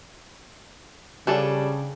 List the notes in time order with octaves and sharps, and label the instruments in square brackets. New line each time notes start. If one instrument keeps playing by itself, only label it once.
[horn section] C#3 [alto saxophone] G3 [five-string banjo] D4 G#4 A4